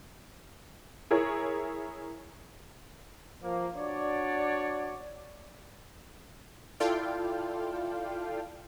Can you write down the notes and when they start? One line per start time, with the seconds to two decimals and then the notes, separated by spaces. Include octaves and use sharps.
1.11 E4 G#4 A#4 C#5
3.43 F3 A#3
3.76 D4 F#4 C#5 D5
6.80 E4 F4 A4 D5 F5 G5